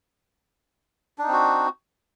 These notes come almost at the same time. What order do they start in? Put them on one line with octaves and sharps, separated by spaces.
D4 D#4 C4 F#4